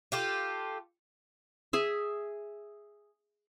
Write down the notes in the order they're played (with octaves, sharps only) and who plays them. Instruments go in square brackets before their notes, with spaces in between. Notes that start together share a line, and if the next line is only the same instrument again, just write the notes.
[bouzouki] F4 G4 A4
[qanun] G#4 E5